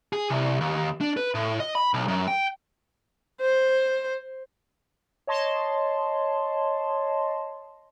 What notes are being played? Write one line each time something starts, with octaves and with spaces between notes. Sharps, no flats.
G#4
C2
D#2
D4
B4
A2
D#5
B5
B1
F#2
G5
C5
C#5 D#5 A5 C6